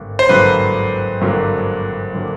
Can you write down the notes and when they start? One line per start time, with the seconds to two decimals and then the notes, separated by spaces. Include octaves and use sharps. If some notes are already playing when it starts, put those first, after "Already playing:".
Already playing: G#1 G2 D3 A#3
0.19 C5
0.29 G#1 G2 D3 F#3 A#3 B4
1.21 G#1 G2 D3 F#3 A#3
2.14 D3 F#3 A#3